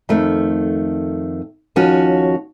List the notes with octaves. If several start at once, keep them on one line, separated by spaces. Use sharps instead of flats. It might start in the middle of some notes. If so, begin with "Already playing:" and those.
F2 D#3 A3
D#2 F3 C#4 F#4 C#5